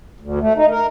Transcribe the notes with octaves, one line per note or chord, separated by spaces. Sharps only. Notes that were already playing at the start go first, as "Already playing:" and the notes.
D2
A3
D#4
A#4